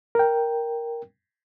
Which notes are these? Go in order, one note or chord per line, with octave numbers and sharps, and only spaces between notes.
A#4 G5